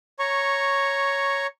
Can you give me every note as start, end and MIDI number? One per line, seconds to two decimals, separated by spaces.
0.19 1.47 73
0.19 1.47 82
0.19 1.47 85